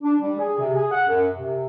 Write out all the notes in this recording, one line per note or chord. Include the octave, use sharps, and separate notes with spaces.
D4
G3
G#4
C3
G#4
F#5
F#2
C3